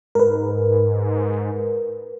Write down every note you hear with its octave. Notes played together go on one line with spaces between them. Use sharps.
G#2 A#4 B4